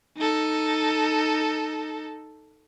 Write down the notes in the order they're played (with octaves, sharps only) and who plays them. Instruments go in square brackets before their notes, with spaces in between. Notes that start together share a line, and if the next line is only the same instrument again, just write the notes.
[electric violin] D#4 A4